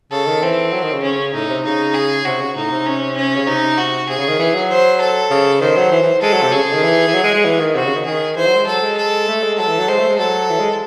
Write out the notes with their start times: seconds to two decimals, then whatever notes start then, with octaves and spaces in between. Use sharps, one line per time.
0.12 C#3 A4
0.27 D#3
0.42 E3 C4
0.72 F#3
0.83 D#3
0.93 C#3
1.03 C#4
1.34 A2 D#4
1.48 C3
1.65 C#3 D#4
1.94 G#4
2.25 C3 F#4
2.40 C#3
2.56 A2 D#4
2.71 C3
2.86 C#4
3.17 C#4
3.35 C#3
3.47 C3 D#4
3.77 F#4
4.08 C3 G#4
4.18 C#3
4.28 D#3
4.39 E3
4.54 F#3
4.69 C5
5.01 A4
5.30 C#3
5.61 D#3 C5
5.76 F#3
5.91 E3
6.02 E3
6.22 G#3 A4
6.33 F#3
6.43 C3
6.52 C#3 G#4
6.63 C#3
6.73 D#3
6.83 E3
7.08 E3
7.14 F#3
7.24 G#3
7.34 G#3
7.45 E3
7.60 D#3
7.75 C3 F#4
7.85 C#3
7.95 D#3
8.05 D#3 G#4
8.36 E3 C5
8.46 F#3
8.56 G#3
8.67 F#3 A4
8.82 G#3
8.97 A4
9.28 A3
9.43 G#3
9.58 F#3 A4
9.68 E3
9.79 F#3
9.88 G#3 C5
9.99 A3
10.09 G#3
10.19 F#3 A4
10.50 E3
10.59 G#3